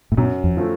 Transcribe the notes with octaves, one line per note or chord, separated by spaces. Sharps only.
A2
F#2 B2
F2
F3 A3